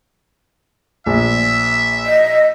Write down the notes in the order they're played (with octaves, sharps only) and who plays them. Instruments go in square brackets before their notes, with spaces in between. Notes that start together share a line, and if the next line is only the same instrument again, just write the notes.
[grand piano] A#1 [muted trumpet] E5
[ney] D#5